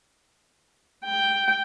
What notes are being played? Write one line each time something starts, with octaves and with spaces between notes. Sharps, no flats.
G5